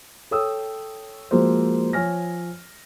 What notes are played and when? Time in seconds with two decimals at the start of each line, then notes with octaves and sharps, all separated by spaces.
0.31 A4 C#5 G5 D#6 E6
1.31 F3 G#3 A#3 F#4 C5
1.93 F3 C#5 G#5 F6 A#6